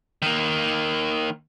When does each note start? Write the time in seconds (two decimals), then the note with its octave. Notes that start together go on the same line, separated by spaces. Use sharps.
0.22 D#3 A#3